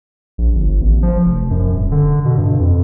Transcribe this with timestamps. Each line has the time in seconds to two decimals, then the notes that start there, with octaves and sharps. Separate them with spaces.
0.38 A#1
0.55 G1
0.81 A1
1.03 F3
1.26 F1
1.51 F#2
1.73 D#1
1.92 D3
2.25 B2
2.37 G2
2.60 F2